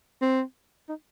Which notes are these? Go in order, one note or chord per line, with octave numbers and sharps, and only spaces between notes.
C4
D#4